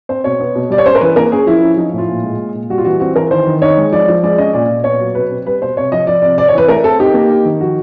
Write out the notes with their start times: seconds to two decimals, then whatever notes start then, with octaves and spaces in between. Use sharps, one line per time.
0.09 C4 C5
0.24 B2 C#5
0.40 B3
0.55 B2
0.70 G3 D5
0.78 C#5
0.86 C#4 C5
0.95 A#4
1.01 E3 B4
1.16 A#3 A#4
1.32 C#4 G#4
1.46 F3 E4
1.62 C#4
1.77 F3 D#4
1.93 A2
1.98 F4
2.08 A#2
2.24 G#3
2.39 A#2
2.54 A#2
2.70 G3 F#4
2.78 F4
2.85 E3 F#4
3.00 C4 F#4
3.16 E3 A#4
3.31 D#3 C5
3.47 D#3
3.62 D#4 C#5
3.78 G#3
3.92 F3 D5
4.08 F3
4.23 G#3 D5
4.38 C#4 D#5
4.53 A#2 D5
4.69 A#2
4.84 B3 C#5
5.00 F#3
5.15 B2 B4
5.31 C4
5.46 G3 B4
5.61 B2 C5
5.77 C3 C#5
5.92 F3 D#5
6.07 F3 D5
6.22 C3 D5
6.38 C4 D5
6.48 C#5
6.53 E3 B4
6.68 A3 A#4
6.84 C4 A4
6.99 D#4 G4
7.14 A#3
7.30 D#4
7.45 D#3
7.61 F3 F#4